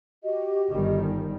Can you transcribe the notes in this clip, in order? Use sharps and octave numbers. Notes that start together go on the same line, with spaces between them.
F#4 G4 D#5
G1 D#3 G3